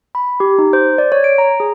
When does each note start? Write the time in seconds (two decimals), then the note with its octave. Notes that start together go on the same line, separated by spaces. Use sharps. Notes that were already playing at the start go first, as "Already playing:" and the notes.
0.15 B5
0.40 G4
0.58 D#4
0.73 C5
0.98 D5
1.12 C#5
1.24 D7
1.38 A#5
1.60 G#4